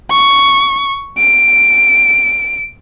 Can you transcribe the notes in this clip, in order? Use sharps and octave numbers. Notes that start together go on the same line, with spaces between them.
C#6
D7